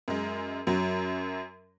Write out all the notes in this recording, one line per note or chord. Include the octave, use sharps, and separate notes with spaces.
F#2 G#3
F#2 F#3